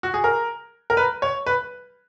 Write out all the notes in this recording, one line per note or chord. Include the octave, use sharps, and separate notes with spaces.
F#4
G#4
A#4
A#4
B4
C#5
B4